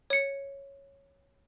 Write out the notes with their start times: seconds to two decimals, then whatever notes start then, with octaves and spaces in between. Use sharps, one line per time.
0.10 C#5 C#7